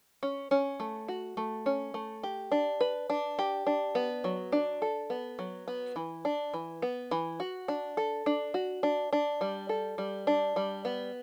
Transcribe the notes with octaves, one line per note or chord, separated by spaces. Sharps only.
C#4
C#4
A3
F#4
A3
C#4
A3
G4
D4
B4
D4
G4
D4
B3
F#3
D4
A4
B3
F#3
B3
E3
D4
E3
B3
E3
F#4
D4
A4
D4
F#4
D4
D4
G3
A4
G3
D4
G3
B3